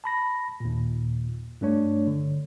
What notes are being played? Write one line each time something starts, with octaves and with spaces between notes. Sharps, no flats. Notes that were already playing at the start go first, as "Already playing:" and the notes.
A5 B5 A#6
D#2 A#2
G2 A3 D4 C#5
D3